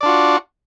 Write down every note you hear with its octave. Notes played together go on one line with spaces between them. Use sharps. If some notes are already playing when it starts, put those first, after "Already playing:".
D4 F4 F#4 D5